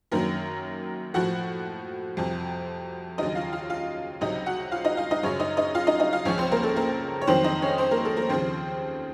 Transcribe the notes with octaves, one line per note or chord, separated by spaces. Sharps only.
F#2 D#3 F#3 A#3 A#4
A2 F3 F#4 F#5
F2 C3 F3
D#2 C#3 F#3 D#4 D#5
F4 F5
F4 F5
F4 F5
C#2 C3 F#3 D#4 D#5
F#4 F#5
F4 F5
D#4 D#5
F4 F5
D#4 D#5
F#2 C#3 F#3 C#4 C#5
D#4 D#5
D#4 D#5
F4 F5
D#4 D#5
D#4 D#5
F4 F5
C#2 C#3 F3 C#4 C#5
C4 C5
A#3 A#4
A4
A#3 A#4
C#5
F2 D#3 F#3 C4 C5
D#4 D#5
C#4 C#5
C4 C5
A#3 A#4
A4
A#3 A#4
D#2 C#3 F3 C4 C5